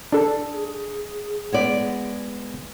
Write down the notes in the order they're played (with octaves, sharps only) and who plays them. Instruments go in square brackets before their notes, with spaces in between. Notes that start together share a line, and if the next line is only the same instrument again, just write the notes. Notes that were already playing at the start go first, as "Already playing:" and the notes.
[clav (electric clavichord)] D4 A4 [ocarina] G#4
[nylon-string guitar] G#3 B3 D5